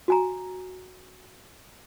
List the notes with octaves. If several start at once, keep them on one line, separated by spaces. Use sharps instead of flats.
F#4 G#5 A#5